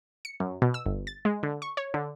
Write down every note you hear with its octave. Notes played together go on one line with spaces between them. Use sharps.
C#7
F#2
B2
E6
G1
A6
G#3
D3
C#6
C#5
D3